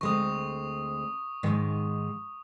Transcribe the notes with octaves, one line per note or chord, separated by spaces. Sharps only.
D2 G#3 C4 C#6 D#6
G#2 D#3 G#3